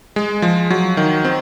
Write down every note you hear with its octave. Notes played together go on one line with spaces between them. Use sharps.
G#3
F3
F#3
D#3
C4